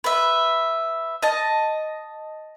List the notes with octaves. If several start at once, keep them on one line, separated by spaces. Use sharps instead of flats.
B4 E5
D#5 A5